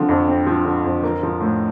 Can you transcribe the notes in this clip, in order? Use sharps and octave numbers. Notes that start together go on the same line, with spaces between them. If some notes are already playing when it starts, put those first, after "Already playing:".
Already playing: D3 F3 C4
F2
C4
F3
D3
F2
A#3
F3
A2